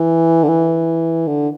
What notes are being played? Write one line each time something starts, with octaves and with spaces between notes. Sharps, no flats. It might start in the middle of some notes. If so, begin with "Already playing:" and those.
Already playing: E3
D3
E3
D3